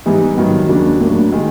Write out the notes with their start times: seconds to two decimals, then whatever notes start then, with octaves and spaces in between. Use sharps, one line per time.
0.06 G#2 E3 G3 B3 D#4
0.37 G2 D#3 F#3
0.69 D#2 C#3 F#3 A#3 D4
1.01 A2 F#3 A#3 D4
1.32 D#3 G#3